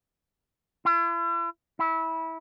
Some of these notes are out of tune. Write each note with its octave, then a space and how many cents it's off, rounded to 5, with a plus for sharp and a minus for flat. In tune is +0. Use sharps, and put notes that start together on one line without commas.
E4 +45
E4 -20